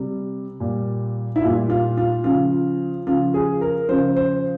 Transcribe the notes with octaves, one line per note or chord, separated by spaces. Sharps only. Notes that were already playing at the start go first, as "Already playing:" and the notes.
Already playing: C3 G3
A#2 G3
E4
A#2 G3 F4
F4
F4
C#3 F3 F4
C#3 F3 F4
G#4
A#4
C#3 F3 C5
C5